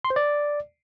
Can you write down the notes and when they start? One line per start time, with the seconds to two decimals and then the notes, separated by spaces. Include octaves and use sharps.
0.05 C6
0.10 C5
0.16 D5